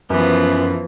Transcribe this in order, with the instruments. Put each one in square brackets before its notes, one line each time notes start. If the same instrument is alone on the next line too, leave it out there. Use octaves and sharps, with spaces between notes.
[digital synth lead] F#2 [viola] E3 F3 [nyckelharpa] B3